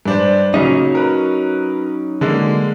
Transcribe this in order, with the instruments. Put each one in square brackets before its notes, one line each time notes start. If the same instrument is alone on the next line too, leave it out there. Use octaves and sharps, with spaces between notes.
[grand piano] G2 D4 C5
[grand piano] A#2 C#3 [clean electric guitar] F#3 C#4 D#4
[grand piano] A#4 B4
D3 G#3 A#3